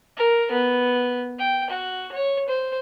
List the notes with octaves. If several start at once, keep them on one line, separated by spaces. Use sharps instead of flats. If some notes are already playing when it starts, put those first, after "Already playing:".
A#4
B3
G5
F#4
C#5
C5